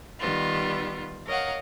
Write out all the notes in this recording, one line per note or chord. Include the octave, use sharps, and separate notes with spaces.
D#3 G3 B3 F4
A#4 C#5 D#5 F5 F#5